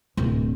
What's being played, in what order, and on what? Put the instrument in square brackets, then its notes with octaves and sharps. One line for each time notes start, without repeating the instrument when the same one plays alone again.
[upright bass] D1